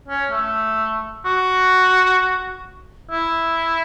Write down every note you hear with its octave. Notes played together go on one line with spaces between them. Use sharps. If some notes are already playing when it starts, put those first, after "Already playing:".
C#4
A3
F#4
E4